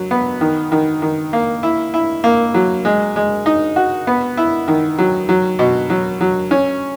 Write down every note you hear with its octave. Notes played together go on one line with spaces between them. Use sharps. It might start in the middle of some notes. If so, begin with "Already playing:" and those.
Already playing: F#3
B3
D#3
D#3
D#3
A#3
E4
E4
A#3
F#3
G#3
G#3
D#4
F#4
B3
E4
D#3
F#3
F#3
B2
F#3
F#3
C#4